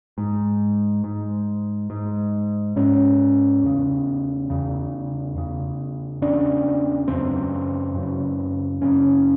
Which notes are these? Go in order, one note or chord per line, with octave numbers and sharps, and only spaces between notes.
G#2
G#2
G#2
G#2 C#4
E2 C#3
E2 C#3
E2 C#3
E2 C#3 D4
F#2 C#3 C4
F#2 C#3
F#2 C#3 C#4